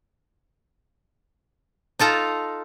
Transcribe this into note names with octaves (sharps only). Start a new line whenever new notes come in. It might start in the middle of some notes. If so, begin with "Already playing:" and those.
D#4 F4 A4 A#5